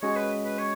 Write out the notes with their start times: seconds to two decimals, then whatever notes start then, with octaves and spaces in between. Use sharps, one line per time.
0.02 G#3 C#4 F#4 C#5
0.16 B4
0.44 B4
0.59 C#5